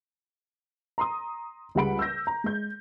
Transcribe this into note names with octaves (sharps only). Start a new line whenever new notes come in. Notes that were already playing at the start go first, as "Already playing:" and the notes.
A#5 C6 D#6
C#2 G3 G#4 F#5 B5 D7
E6 G6 A#6
A#5
G#3 G6